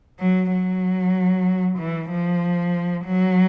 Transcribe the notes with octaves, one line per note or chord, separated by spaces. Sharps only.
F#3
F#3
E3
F3
F#3